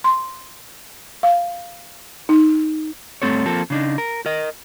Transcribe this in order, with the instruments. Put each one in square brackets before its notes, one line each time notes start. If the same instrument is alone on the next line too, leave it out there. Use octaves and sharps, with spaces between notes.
[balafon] C6
F5
D#4
[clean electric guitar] G2 A3 C4 A4 C#5
F3 A#3 C4 A4
C#3 D4 D#4
A#4
A#4 D#5